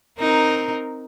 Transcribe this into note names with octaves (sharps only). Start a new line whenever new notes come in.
C4 D#4 A#4